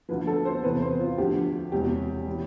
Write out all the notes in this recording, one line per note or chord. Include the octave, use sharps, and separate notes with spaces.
D2 D3 F3 B4
A4
C5
E2 C3 E3 B4
C5
F4
D2 D3 F3 G4
E1 E2 C3 E3 G3 G4
E3 G3